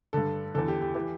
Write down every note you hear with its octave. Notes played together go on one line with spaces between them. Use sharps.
G2 D3 A4
E2 D3 A4
G4
G4
E3 G4